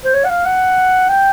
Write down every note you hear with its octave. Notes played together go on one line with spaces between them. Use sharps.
C5
C#5
F#5
F5
F#5
G5